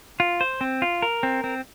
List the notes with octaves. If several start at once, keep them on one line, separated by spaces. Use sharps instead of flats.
F4
C5
C4
F4
A#4
C4
C4